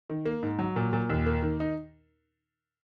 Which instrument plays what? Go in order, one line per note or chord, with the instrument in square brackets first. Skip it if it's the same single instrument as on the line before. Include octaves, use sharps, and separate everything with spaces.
[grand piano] D#3
A#3
G#2
F#3
A#2
A#2
D#2
A#3
D#3
D#4